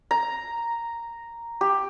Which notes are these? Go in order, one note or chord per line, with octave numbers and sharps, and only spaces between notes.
A#5
G4